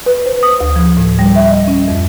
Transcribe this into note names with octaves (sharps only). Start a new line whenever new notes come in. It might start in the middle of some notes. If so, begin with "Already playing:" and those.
B4
C5
D#6
D2
F3
A2
G3
E5
D#5
C#4
F2